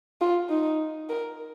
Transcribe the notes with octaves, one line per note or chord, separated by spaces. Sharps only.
F4
D#4
A#4